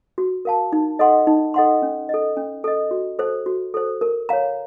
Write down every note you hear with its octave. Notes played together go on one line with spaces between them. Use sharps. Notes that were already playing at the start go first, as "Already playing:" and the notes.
F#4
A#4 F5 A5
D#4
A4 D#5 F#5 C6
D#4
A4 D#5 F#5 C6
C#4
A4 D#5
C#4
A4 D#5
F#4
A4 C5
F#4
A4 C5
A#4
C#5 F5 A#5